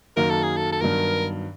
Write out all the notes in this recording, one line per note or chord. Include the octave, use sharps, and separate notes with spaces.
F#2 D#3 F#3 A#3 A#4
A4
G#4
A4
A4
G2 D#3 F#3 B3 A#4